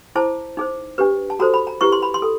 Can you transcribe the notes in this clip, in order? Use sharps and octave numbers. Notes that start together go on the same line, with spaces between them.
E4 G#4 C5 A5
D#4 G#4 C5
D4 G4 B4
A5
F#4 A4 C5 A#5
B5
A#5
E4 G4 B4 C#6
C6
B5
C6
A4